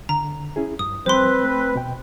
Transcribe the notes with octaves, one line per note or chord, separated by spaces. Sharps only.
D3 A#5
C#4 E4 G#4
G2 D#6
F3 G3 C4 B4 C5 C6
A3
B2 G5